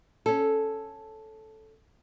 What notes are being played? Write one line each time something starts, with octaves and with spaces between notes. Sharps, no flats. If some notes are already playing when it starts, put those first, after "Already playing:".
C#4 A4